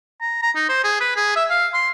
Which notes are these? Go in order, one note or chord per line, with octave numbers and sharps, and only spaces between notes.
A#5
A#5
D#4
C5
G#4
B4
G#4
E5
F5
C6